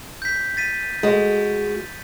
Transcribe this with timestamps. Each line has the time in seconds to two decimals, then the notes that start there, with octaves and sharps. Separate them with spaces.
0.22 G6 B6
0.57 A6 B6 D#7
1.03 G#3 F#4